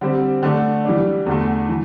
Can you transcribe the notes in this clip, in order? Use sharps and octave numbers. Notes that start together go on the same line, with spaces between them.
D3 G3 C4
D3 A3 D4
E3 G3 D4
E2 D3 A3
E3